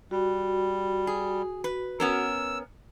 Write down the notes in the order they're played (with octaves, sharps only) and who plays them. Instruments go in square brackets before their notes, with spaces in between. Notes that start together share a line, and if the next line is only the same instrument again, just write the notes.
[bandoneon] G3 [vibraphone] F#4
[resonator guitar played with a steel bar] G#4
B4
[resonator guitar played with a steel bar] B3 C#4 A#4 [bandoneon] E6